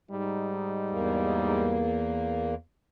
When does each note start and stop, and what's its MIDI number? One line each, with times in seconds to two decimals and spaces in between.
0.11 1.85 44
0.11 1.85 55
0.11 1.85 63
0.90 2.55 40
0.90 2.55 58